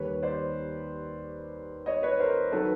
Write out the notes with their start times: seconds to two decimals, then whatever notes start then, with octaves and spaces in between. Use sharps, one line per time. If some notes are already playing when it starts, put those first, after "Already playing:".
Already playing: D#2 D#3 G3 B4 C#5
0.22 C5 D5
1.86 C#5 D#5
2.03 B4 C#5
2.19 A#4 C5
2.52 D#3 F#3 A4 B4